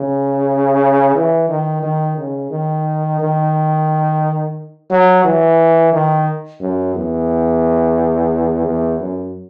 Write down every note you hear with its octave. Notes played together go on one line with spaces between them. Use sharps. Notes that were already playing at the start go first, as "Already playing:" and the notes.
Already playing: C#3
E3
D#3
D#3
C#3
D#3
D#3
F#3
E3
D#3
F#2
E2
E2
F#2